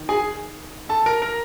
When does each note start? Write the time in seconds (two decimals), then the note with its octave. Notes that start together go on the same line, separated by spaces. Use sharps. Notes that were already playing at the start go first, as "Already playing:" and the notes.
Already playing: D#3
0.09 G#4 G#5
0.89 A4 A5
1.06 A#4 A#5
1.22 A#4 A#5